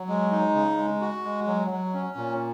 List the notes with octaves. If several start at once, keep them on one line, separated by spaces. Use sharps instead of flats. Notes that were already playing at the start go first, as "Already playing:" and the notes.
Already playing: F#3
G#3
D#4
C#3
G#3
F#4
G#3
F#3
F#3
C#4
A#2